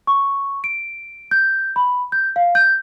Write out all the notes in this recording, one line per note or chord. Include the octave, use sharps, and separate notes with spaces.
C#6
D7
G6
B5
G6
F5
G6